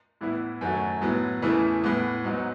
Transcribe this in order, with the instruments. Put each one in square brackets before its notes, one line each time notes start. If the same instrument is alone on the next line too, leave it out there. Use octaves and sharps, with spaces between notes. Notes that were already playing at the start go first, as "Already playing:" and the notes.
[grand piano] A2 E3 B3 E4
F#2 D#3 A3 C#4 F#4
A2 F#3 B3
E2 C#3 E3 A3 E4
A2 E3 B3
G#2 F#3 B3 D#4 F#4